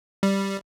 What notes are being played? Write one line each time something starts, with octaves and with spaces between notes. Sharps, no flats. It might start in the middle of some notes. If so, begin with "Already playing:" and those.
G3